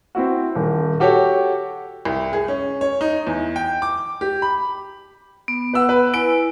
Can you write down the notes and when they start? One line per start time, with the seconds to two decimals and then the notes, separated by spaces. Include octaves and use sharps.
0.15 C4 E4 F#4
0.55 D#1
1.00 F#4 G4 A4 C#5
2.05 C2
2.33 G#4
2.48 C#4
2.81 C#5
3.01 D#4
3.27 E2
3.56 G5
3.82 D6
4.21 G4
4.42 B5
5.48 B3
5.73 B4 F#5 E6
5.89 B4
6.14 E4 B4 G#5 D7